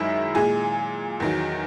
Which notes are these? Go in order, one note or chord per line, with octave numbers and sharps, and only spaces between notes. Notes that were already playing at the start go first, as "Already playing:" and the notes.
Already playing: F#2 D#3 G#3 E4
A#2 G#3 G#4
E2 D#3 F#3